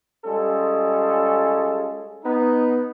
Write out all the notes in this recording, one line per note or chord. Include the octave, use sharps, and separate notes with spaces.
G3 G#3 C#4 F4 G#4 A4
B3 D#4